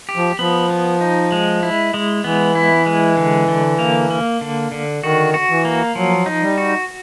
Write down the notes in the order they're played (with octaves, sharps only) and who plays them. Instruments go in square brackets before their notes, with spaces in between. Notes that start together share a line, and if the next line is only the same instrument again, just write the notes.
[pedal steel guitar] G4
[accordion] F3
[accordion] F3 [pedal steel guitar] B3
[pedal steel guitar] B3
D#4
G#3
E4
G#3
[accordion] E3 [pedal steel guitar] B3
[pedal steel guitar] E4
G#3
D3
D3
A#3
A#3
D3
D3
[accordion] D#3 [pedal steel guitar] F#4
[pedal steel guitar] F#4
[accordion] E3
[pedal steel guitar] A#3
[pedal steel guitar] F3 [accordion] F#3
[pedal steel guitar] D#4
[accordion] G3
[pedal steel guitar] F#4